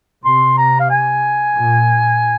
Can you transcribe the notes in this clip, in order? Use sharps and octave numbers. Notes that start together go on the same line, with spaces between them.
C3 C6
A#5
F5
G#5
A#2